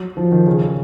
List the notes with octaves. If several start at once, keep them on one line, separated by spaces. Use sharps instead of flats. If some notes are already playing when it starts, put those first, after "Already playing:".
Already playing: F#3
F3
D#3
C#3
C#3